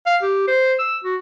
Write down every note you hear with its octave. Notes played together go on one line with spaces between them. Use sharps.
F5
G4
C5
E6
F#4